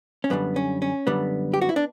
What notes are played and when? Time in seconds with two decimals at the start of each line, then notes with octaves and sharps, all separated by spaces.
0.24 C#4
0.30 F#2 D3 G3 B3
0.56 C#4
0.82 C#4
1.07 F#2 D3 G3 B3
1.54 G4
1.62 F#4
1.69 E4
1.76 D4